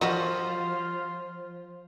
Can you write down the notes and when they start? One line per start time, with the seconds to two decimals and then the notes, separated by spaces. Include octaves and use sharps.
0.01 F3 G3 F4 F#4 D#5